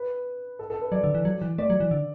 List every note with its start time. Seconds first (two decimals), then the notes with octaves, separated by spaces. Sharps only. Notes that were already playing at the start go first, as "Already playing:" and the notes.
Already playing: B4
0.59 A4
0.70 A4
0.81 B4
0.92 F#3 D5
1.04 D3
1.15 E3
1.25 F#3
1.42 E3
1.58 A3 D5
1.70 F#3
1.80 E3
1.91 D3